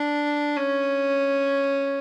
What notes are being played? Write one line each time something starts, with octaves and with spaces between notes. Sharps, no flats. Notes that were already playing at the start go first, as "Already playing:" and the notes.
Already playing: D4
C#4